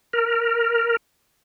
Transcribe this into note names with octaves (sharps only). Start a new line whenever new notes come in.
A#4